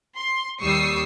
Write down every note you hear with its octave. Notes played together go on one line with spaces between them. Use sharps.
C6
D#2 G3 C#6 D#6 E6 C7